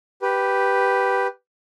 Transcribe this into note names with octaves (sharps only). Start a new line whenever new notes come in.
G4 B4